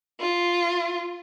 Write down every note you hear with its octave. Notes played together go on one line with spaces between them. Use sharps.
F4